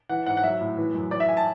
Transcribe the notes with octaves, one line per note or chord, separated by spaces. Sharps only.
E3 F#5
G#2 F#5
F#5
F#3 E5
A2
E3
F#2
E3 D5
E5
G#5
A5